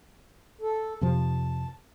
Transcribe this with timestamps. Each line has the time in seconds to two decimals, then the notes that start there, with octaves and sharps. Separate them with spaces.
0.61 A4
1.01 F2 C3 F3 A5